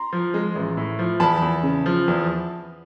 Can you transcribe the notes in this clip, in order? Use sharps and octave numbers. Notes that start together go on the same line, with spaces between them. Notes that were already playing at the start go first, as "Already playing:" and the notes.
Already playing: A#5 C6
F3
G#3
A1
A2
F3
E2 A5 B5
E2
C#3
F3
E2